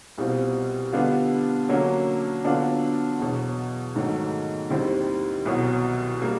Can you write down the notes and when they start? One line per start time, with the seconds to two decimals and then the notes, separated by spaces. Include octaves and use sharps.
0.18 C2 B2 G3 C4 F4
0.93 D3 G3 B3 D4 F4
1.69 D3 F#3 A#3 C#4
2.44 D3 F#3 B3 D4 F4
3.19 E2 B2 F#3
3.95 G#2 D#3 F#3 A3
4.70 D#2 D#3 G3 C4 E4
5.46 C2 B2 F#3
6.22 G3 A#3